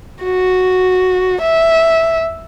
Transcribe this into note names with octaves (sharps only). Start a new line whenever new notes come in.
F#4
E5